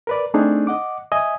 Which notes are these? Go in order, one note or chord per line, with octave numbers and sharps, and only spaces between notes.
A#4 B4 D5
A3 C4 D4 D#4 G#4
D#5 F#5 D6
D#5 E5 G#5 D#6